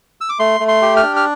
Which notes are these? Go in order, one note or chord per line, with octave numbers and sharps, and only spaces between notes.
E6
D6
A3 C6
A3
C6
G4
F6
D4
F6